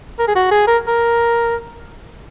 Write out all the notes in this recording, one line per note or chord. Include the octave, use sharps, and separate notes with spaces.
A#4
G#4
F#4
G#4
A#4
A#4